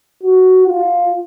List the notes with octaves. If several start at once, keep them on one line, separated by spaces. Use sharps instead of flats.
F#4
F4